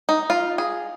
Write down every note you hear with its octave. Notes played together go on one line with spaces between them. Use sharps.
D#4
F4
G#4